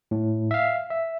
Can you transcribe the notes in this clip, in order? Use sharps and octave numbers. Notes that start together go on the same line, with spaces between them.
A2
E5 F5
E5